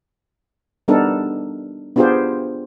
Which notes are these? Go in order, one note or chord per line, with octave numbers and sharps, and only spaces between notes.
G3 B3 D4 D#4 A4 A#4
B3 D4 F4 G4 G#4 C5